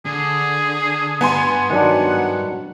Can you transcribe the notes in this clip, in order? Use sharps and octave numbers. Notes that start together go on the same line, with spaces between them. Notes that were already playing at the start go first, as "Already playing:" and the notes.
D3 G#4
G2 B3 G#5 C6
D#3 F#3 D4 F#5